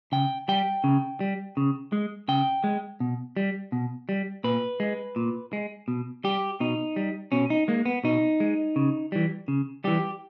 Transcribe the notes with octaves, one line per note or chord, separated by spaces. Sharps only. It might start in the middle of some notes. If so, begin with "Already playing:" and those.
C#3 G5
G3 G5
C#3
G3
C#3
G#3
C#3 G5
G#3
B2
G3
B2
G3
A#2 B4
G#3
A#2
G#3
B2
G3 G4
B2 D#4
G3
B2 C#4
D#4
G#3 A#3
B3
B2 D#4
G#3
C#3
E3 G3
C#3
E3 G3 G4